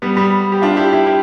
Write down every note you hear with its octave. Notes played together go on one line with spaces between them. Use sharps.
G3 B3
G3 B3
G4
D4 F4
E4 G4
E4 G4
E4 G4